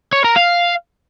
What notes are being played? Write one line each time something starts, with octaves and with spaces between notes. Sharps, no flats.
C#5
A#4
F5